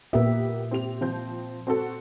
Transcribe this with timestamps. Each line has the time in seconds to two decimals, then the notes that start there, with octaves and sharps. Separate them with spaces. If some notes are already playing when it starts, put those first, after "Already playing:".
0.13 A#2 A#3 B3 G4 E5
0.71 C4 G4 F7
1.01 F3 C4 G6
1.67 C4 F#4 A4